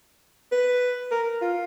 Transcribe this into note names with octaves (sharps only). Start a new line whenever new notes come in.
B4
A#4
F4